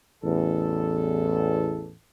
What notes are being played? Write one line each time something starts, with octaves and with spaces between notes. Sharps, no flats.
A1 E2 A4